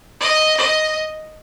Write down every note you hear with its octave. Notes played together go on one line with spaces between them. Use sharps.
D#5
D#5